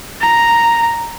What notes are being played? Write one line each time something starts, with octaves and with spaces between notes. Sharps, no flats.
A#5